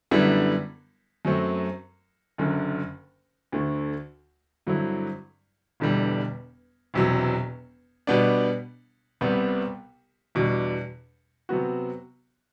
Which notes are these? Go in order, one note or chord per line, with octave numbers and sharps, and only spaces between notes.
F#2 D3 G3 B3 E4
F#2 F#3 A3 C4
F#1 F#2 D3
D2 D3 A3
G2 D3 F#3 C4 E4
E1 E2 D3 G3
E1 E2 C3 F#3
B2 G3 B3 D4
C2 C3 G3 B3
E2 B2 G3 D4
C3 F#3 B3 F#4